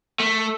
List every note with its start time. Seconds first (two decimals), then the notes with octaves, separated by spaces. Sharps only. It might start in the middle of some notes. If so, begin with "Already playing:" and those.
0.20 A3